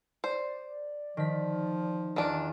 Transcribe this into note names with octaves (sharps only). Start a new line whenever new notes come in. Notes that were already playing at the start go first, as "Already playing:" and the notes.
C5 D5
D#3 F3 B6
E2 D#3 D4 F4 D7